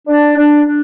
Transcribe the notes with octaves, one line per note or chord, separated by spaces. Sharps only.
D4
D4
D4